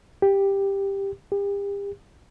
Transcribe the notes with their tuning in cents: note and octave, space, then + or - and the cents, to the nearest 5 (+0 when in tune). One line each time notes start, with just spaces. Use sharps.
G4 +10
G4 +40